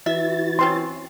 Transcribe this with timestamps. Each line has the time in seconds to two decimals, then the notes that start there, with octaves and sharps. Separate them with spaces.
0.06 E3 E4 F#4 E5 A6
0.59 F#3 C4 C#4 C6